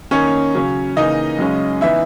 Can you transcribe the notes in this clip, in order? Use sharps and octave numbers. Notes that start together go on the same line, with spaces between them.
D#3 A#3 C#4 D#4 C#5
C#3 F#3 C#4
C#3 E3 A#3 D#4 D#5
F#2 C#3 G#3 C#4
E3 B3 D#4 E4 E5